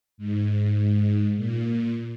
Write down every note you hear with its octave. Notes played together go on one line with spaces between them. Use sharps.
G#2
A#2